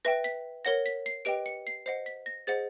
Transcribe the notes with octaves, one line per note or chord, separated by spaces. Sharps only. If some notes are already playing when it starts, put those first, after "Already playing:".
B4 E5 G5 A#6
B6
A#4 C#5 F#5 A#6
B6
C7
G4 B4 D#5 G5 D7
C#7
C7
C5 D#5 F#5 C7
B6
A#6
G#4 C5 D#5 F#5 A6